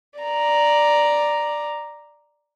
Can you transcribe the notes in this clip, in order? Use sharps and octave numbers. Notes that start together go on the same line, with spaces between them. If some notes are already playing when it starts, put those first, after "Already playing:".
D5 A#5